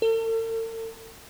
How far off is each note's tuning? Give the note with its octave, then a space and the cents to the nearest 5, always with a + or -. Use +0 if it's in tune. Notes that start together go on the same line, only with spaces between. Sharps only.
A4 +45